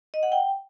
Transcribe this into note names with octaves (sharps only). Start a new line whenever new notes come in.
D#5
F#5
G5